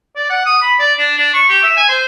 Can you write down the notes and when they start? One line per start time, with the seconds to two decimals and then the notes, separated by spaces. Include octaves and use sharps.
0.16 D5
0.29 F#5
0.45 D#6
0.62 B5
0.79 D5
0.98 D4
1.17 D4
1.34 C#6
1.49 G4
1.63 E5
1.77 G#5
1.89 C5